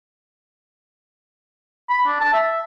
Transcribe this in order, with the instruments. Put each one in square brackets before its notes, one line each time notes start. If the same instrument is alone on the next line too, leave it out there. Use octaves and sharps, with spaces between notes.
[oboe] B5
D4
A5
E5